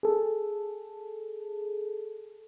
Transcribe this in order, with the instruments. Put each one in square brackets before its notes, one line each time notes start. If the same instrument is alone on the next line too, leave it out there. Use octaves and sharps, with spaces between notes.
[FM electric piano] G#4 A4